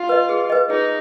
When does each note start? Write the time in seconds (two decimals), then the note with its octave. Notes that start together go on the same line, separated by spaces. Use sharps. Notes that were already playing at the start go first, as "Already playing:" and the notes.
Already playing: F4
0.09 B4 D#5
0.29 G#4
0.50 B4 D#5
0.70 D#4 G#4